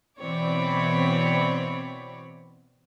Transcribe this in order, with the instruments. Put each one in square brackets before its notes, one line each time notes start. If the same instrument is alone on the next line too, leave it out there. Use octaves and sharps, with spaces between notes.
[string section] B2 E3 C4 C#5 D5 B5